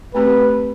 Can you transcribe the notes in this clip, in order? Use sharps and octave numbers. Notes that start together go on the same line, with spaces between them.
A3 C4 G4 B4